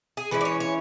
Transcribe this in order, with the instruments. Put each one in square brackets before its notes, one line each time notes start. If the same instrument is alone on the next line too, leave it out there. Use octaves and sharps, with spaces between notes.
[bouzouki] G#4
E3 G#3 C#4 E4 B4
D5
C#5
C#5